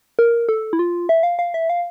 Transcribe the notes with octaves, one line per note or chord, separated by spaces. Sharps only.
A#4
A4
E4
F4
E5
F5
F5
E5
F5